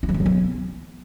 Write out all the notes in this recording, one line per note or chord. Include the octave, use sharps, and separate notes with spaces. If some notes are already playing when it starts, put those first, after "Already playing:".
E4
F3
E3
F#3
B3